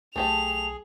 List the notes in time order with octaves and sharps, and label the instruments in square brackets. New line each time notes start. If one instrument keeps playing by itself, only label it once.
[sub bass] B1 [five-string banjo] A3 G4 A5 [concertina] G#4 [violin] F7